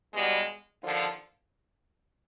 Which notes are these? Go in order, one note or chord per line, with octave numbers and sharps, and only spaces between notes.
E2 B2 G3 G#3
D#2 D3 F3